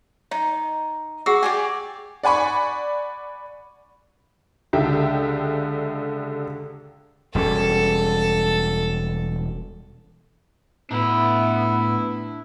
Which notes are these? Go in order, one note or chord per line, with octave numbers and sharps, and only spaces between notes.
D#4 D#5
F#4 G#4 F#5 E6
G4 D5 G#5
D5 F#5 G#5 B5 C#6
C#2 D3 G4 E5
E1 G3 C#4 A4
A2 B3 D4 E4 E5